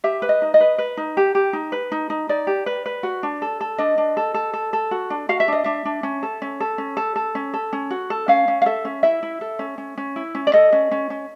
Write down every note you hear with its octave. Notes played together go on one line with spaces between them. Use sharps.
G4 E5
B4
D#5
D#4
D#5
B4
B4
D#4
G4
G4
D#4
B4
D#4
D#4
D#4 D5
G4
B4
B4
F#4
D4
A4
A4
D4 D#5
D4
A4
A4
A4
A4
F#4
D4
F#4 F5
E5
D4 D#5
D4 E5
D4
C#4
A4
C#4
A4
C#4
A4
A4
C#4
A4
C#4
F#4
A4
C#4 F5
C#4
F5
A4 E5
C#4
E4 E5
E4
A4
C#4
C#4
C#4
E4
C#4
D5
A4 D#5
C#4
C#4
C#4